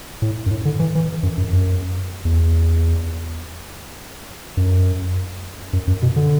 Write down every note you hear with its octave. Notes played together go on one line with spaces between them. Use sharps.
A2
F#2
A2
D3
E3
E3
F#2
F#2
F#2
E2
F#2
F#2
F#2
B2
D3